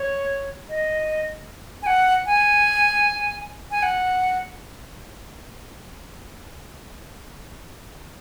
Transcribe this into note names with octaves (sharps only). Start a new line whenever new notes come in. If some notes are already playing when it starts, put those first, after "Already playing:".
Already playing: C#5
D#5
G#5
F#5
G#5
G#5
F#5